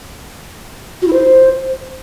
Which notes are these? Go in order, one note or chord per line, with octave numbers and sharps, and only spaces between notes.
F#4
E4
C5